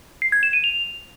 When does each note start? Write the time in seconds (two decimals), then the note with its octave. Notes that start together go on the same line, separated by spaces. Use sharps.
0.22 C7
0.32 G#6
0.43 E7
0.53 D#7
0.64 F7